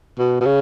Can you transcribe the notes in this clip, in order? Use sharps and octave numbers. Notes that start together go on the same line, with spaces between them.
B2
B2
C#3